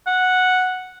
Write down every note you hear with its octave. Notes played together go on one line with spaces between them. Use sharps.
F#5